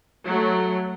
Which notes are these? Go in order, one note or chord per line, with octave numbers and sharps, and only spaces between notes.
F#3 A3